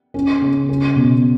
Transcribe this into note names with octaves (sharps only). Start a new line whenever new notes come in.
C#4
C#3
C#4
B2